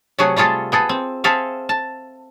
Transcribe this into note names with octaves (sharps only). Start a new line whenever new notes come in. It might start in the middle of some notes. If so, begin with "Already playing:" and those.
C3 F#3 A3 F#4 G#4
G3 A3 F4 G#4 A4
B3 G#4 A4
C4
C4 G#4 A4 E5 F5
A5